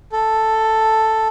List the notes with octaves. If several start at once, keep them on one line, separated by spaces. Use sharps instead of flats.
A4